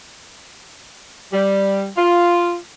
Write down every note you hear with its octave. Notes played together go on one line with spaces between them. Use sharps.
G3
F4